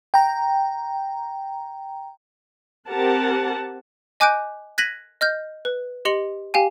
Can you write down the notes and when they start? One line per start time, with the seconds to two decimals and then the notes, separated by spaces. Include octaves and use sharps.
0.14 G5 A#5
2.89 C4 G4 A#4 F#5 A5
4.20 D#5 G#5 D6 F#6 G6 D7
4.78 F#6 G#6 A#6 B6 D#7 F#7
5.21 D#5 F6 G6
5.65 B4
6.05 G4 D#5 C6 C#7 F#7
6.54 G4 F5 G5 G#5